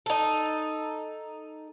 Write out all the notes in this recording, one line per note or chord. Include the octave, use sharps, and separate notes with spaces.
D#4 A4